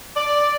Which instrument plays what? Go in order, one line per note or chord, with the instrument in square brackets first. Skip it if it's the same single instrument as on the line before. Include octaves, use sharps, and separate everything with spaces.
[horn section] D5